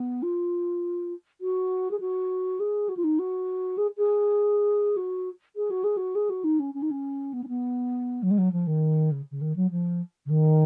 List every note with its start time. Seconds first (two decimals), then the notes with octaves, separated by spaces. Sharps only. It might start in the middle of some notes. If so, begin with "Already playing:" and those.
Already playing: B3
0.22 F4
1.41 F#4
1.91 G#4
2.00 F#4
2.60 G#4
2.89 F#4
2.97 F4
3.04 D#4
3.19 F#4
3.77 G#4
3.97 G#4
4.96 F#4
5.56 G#4
5.70 F#4
5.84 G#4
5.97 F#4
6.15 G#4
6.30 F#4
6.44 D#4
6.59 C#4
6.74 C#4
6.82 D#4
6.91 C#4
7.33 B3
7.43 C#4
7.48 B3
8.23 F#3
8.31 G#3
8.38 F#3
8.52 F3
8.67 D#3
9.11 C#3
9.31 C#3
9.41 D#3
9.56 F#3
9.71 F3
10.26 C#3
10.29 D#3